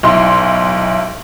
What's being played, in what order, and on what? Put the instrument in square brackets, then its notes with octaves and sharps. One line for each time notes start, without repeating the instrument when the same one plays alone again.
[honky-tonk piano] B1 E4 C6